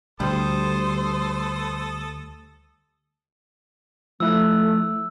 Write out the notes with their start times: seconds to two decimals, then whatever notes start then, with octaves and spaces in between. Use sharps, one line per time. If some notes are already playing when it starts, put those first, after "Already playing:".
0.20 D2 G3 A4 C5 D#6
4.20 F3 A3 E4 E6 F#6